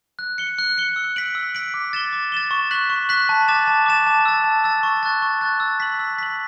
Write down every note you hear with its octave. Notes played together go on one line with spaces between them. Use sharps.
F#6
C#7 G7
F#6
C#7 G7
E6
B6 D7 F#7
E6
B6 D7 F#7
D6
A6 E7 G7
D6
A6 E7 G7
C#6
F#6 B6 F#7
C#6
F#6 B6 F#7
A5
D6 A6 E7
A5
D6 A6 E7
A5
E6 A6
A5
E6 A6
C#6
F#6 A6
C#6
F#6 A6
E6
B6 F#7
E6
B6 F#7